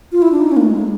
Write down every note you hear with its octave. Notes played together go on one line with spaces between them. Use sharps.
F4
E4
D4
D#4
C#4
A#3
A3
G#3